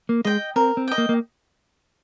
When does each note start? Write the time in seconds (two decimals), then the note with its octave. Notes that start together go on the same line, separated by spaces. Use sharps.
0.09 A#3
0.25 G#3 D#5 G5
0.56 C4 A#4
0.77 C4
0.88 D#5 G5
0.98 A#3
1.09 A#3